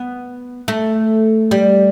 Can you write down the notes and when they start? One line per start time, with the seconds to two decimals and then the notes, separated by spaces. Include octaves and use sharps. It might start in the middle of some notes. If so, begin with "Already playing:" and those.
Already playing: B3
0.68 A3
1.51 G3